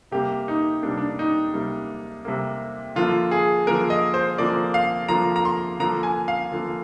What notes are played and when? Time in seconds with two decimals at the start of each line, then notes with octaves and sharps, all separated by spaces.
0.11 C3 G3 A#3 G4
0.48 D#4
0.82 C3 G3 A#3 D4
0.97 D4
1.19 D#4
1.54 C3 G3 A#3
2.25 C3 G3 A#3
2.96 D3 F3 A#3 F4
3.31 G#4
3.67 D3 F3 A#3 A#4
3.90 D#5
4.14 C5
4.38 D3 F3 A#3 D5
4.74 F5
5.08 D3 F3 A#3 A#5
5.36 A#5
5.45 C6
5.79 D3 F3 A#3 A#5
6.03 G#5
6.28 F5
6.52 D3 F3 A#3